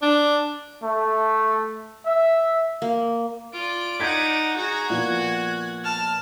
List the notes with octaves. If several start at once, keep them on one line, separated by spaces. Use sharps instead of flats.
D4
A3
E5
A#3
F4 D5 D7
D#4 F#5 G6 G#6 B6
F#4 G#4 A#5
A#2 F3 B3 F#6 G#6
A5 F6